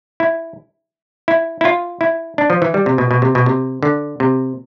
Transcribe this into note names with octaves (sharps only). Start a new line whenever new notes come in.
E4
E4
E4
F4
E4
D4
F3
E3
G3
C3
B2
B2
C3
B2
C3
D3
C3